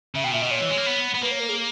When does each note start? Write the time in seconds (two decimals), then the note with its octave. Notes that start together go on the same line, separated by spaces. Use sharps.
0.15 C#3 E5
0.24 B2 G5
0.32 A#2 E5
0.42 B2 D#5
0.51 A#2 C#5
0.60 E3
0.69 G#3
0.77 A#3
0.86 B3
1.14 B3
1.22 A#3 B4
1.31 C#5
1.40 A#4
1.49 G#4